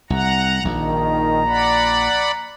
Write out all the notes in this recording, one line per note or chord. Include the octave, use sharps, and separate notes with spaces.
C2 F#5 A#5
A#1 D#3 A#5
D5 F#5 B5